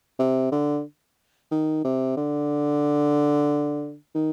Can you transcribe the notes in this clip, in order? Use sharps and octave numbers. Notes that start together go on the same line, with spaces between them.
C3
D3
D#3
C3
D3
D#3